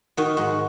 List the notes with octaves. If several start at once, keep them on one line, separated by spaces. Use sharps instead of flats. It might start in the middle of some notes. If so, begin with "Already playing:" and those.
D#3 F#4
G#2 F#4